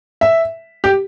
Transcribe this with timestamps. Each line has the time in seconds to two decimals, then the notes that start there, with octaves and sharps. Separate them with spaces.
0.21 E5
0.84 G4